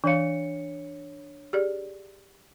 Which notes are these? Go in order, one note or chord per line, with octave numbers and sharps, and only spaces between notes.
E3 D4 C#5 F5 C#7
G4 G#4 D5